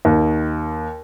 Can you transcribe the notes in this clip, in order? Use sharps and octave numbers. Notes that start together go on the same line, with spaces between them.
D#2